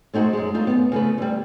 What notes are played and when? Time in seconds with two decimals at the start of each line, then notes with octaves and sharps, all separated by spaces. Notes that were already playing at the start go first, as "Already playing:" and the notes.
0.14 G#3 A3 D#4 F#4 C5
0.33 F#2 G#3
0.54 A3 D#4 F4
0.67 F#2 B3
0.92 C#3 A3 B4
1.18 D2 G3